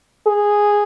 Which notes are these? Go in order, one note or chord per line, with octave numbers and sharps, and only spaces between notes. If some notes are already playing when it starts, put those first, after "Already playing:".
G#4